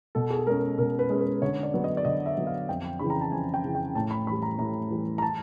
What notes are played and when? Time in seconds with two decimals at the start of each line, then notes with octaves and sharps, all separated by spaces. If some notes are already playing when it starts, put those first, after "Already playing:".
0.15 B2 A4
0.30 G#4
0.38 A4
0.47 G#3 C#4 A#4
0.78 B2 A#4
0.99 B4
1.09 G#3 C#4
1.21 B4
1.42 D3 C#5
1.63 D5
1.74 F#3 B3
1.84 D#5
1.97 D5
2.05 D3 D#5
2.26 E5
2.37 F#3 B3
2.47 F5
2.69 F2 G5
2.99 C#3 E3 B5
3.10 A#5
3.21 A5
3.32 F2 G#5
3.54 G5
3.64 C#3 E3
3.75 G5
3.95 A2 A5
4.11 B5
4.27 E3 B5
4.32 G3
4.43 A#5
4.58 A2 A#5
4.91 E3 G3
5.18 A#5
5.22 A5